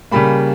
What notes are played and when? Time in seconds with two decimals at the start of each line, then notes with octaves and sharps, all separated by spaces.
0.11 C#3 G3 A#3 B5